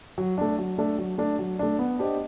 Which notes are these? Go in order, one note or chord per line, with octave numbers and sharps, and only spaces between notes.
F#3
A3 D4
F#3
A3 D4
F#3
A3 D4
F#3
A3 D4
B3
D4 G4 C5 D#5